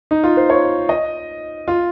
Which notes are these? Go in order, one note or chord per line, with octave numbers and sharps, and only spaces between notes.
D#4
F4
C5
C#5
D#5
F4